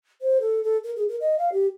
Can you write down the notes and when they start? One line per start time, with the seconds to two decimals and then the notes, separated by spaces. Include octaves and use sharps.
0.22 C5
0.41 A4
0.63 A4
0.84 A#4
0.96 G#4
1.09 A#4
1.21 D#5
1.39 F5
1.52 G4